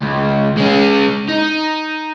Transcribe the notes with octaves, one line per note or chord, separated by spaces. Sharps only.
C#2
G#3 C#4
D#4